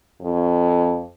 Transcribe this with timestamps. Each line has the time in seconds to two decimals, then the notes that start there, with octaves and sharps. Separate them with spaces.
0.21 F2